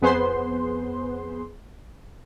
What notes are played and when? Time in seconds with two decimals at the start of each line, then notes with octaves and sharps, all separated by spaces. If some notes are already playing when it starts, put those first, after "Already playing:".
0.02 F2 B3 G#4 B4 C5 C6